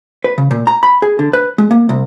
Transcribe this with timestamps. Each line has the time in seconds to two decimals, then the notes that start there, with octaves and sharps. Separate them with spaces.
0.24 B4
0.38 C#3
0.51 A#2
0.67 A#5
0.83 B5
1.02 G#4
1.19 D3
1.33 B4
1.58 G#3
1.71 A#3
1.89 C2